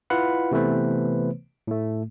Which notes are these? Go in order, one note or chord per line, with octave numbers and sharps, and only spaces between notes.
E4 F4 B4 F5 F#5 B5
C3 E3 A3 B3 B4 C5
A2 A3